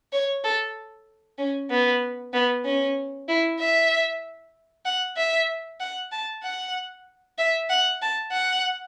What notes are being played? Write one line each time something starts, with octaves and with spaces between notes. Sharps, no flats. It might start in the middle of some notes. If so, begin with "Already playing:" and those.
C#5
A4
C#4
B3
B3
C#4
E4
E5
F#5
E5
F#5
A5
F#5
E5
F#5
A5
F#5